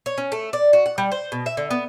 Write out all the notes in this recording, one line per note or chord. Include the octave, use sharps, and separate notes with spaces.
C#5
C#4
A3
D5
F#4
F#5
G3
C5
B2
E5
D3
B3